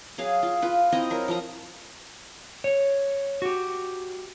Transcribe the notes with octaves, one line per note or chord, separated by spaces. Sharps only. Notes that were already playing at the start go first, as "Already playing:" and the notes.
F#3 G#4 F5
F4
F4 B4
C4 E4 D#5 A#5
F#3 A#4
F3 A#4 D#5 A#5
C#5
F#4 G4